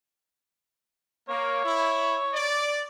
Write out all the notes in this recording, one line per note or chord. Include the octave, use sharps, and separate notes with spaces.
A#3 C#5
E4
D5